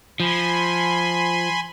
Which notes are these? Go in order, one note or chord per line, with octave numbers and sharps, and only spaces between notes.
F3 G#5 B5 C6